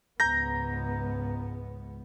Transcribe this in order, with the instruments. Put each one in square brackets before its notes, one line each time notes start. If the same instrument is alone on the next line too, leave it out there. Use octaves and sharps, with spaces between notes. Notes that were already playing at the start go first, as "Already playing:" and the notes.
[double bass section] C#2 G#2 B3 [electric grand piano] A#5 G6 A#6